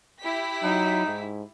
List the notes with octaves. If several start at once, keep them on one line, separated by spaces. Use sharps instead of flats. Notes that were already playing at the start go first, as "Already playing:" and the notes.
E4 G4 B6
F#3 D#4
G#2